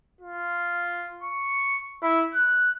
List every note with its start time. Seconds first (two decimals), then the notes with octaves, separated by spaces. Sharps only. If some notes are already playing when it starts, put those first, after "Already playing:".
0.21 F4
1.23 C#6
2.03 E4
2.34 F#6